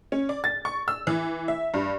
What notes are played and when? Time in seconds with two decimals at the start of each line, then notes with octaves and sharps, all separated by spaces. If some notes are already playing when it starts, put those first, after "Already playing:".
0.12 C#4
0.29 D5
0.44 A6
0.65 C#6
0.88 E6
1.07 E3
1.48 E5
1.74 G2